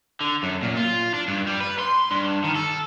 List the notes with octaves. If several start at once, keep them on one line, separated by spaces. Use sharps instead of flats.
D3
F#2
A#2
F4
D4
G2
G3
B4
C6
G2
D#3
A4